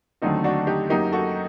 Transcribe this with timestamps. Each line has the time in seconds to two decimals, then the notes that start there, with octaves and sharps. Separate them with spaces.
0.22 D#2 D3 F#3 A3 C4 D#4
0.44 D4 F#4
0.67 D#4 G4
0.90 F#2 F#3 A#3 D#4 G4
1.12 F#4 A4